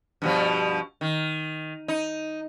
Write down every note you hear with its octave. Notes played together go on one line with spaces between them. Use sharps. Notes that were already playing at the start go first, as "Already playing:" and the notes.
G2 B2 F3
D#3
D#4